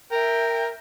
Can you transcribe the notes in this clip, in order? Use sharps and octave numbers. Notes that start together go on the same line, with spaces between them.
A#4 E5 G5